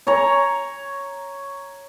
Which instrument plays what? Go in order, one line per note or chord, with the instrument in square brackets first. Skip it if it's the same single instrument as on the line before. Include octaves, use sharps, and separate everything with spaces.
[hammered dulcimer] C#5 A#5